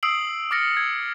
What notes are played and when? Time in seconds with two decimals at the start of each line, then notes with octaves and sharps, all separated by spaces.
0.03 D#6 E6 C7 D7 F#7
0.51 D6 F6 A6 A#6 C#7
0.77 G#6